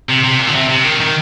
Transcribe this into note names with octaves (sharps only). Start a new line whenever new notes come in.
C3
C3
A#2
D3
C3
C3
D#3
D#3